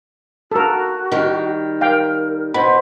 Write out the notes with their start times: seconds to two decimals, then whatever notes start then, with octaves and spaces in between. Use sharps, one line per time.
0.52 F#4 A4 A#4
1.12 D#3 G3
1.81 A#4 F5 G5
2.54 B2 C5 B5